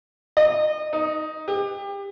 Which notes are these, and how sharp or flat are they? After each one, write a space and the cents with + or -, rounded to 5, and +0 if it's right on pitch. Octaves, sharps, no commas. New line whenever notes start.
D#5 -30
D#4 +5
G4 +25